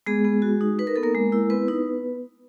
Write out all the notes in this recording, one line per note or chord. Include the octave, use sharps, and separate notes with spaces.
G#3 B3 G#4
B3
F#4
D#4
D#4 B4
A#4
B3 A4
A#3 A#4
G#3
E4
B3 C4 B4
D#4